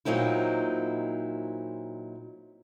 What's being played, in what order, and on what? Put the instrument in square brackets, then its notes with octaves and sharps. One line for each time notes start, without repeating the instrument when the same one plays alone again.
[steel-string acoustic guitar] A#2 F#3 C4 D#4 E4